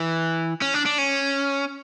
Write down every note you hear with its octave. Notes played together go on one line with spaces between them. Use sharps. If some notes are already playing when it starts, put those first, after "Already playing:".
Already playing: E3
C#4
D4
D4
C#4